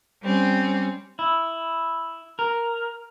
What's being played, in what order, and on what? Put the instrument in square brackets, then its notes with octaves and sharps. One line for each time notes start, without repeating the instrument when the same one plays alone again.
[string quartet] G3 C4 C#4
[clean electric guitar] E4
A#4